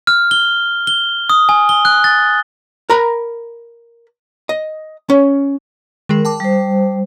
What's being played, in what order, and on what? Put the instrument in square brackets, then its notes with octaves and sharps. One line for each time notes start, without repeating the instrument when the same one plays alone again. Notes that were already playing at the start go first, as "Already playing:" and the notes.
[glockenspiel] F6
G7
G7
D#6
G#5
G7
F#6
A6
[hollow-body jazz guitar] A#4 A#5 B5
D#5
C#4
[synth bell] D#3 G#3 G#4 [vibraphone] A#4
[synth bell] G5 A5 D6
[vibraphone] G3 C5